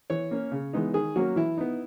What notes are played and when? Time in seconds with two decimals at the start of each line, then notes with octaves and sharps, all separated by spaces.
0.10 E3 C#5
0.31 A#3 C#4
0.52 C#3
0.73 E3 G#3 B3 D#4
0.94 D#3 G#4
1.16 F#3 A#3 C#4 F#4
1.36 E3 E4
1.57 B3 D#4